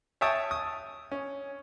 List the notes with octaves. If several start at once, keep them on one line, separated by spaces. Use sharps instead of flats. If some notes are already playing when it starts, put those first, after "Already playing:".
C#5 E5 G5 A5 D#6
D#6
C#4